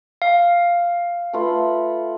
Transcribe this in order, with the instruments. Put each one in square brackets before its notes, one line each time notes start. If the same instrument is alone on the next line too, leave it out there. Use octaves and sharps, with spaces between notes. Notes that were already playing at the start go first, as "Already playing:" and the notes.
[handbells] F5
[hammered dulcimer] A3 F4 B4